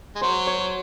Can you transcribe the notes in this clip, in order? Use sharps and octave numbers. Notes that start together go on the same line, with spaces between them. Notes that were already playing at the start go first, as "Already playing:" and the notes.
G#3
F#3 C5
C#5